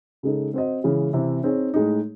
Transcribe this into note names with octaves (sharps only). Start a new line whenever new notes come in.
C#3 G#3 D#4 A4
C4 F#4 C5 D#5
C#3 E3 G#3 C#4
C3 E3 C4
C4 D#4 G#4 C#5
A2 G#3 D#4